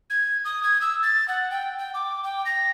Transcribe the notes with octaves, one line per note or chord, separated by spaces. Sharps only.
G#6
D#6
G#6
E6
A6
F#5
G5
G5
D6
G5
A#6